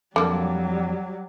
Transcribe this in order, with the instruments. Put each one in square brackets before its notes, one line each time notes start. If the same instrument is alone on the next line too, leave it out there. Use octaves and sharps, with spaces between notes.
[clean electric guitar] F2 [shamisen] D3 A#3 A4 [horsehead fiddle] F#3 G3